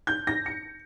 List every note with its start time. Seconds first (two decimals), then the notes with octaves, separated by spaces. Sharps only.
0.07 G6
0.27 A#6
0.46 C#7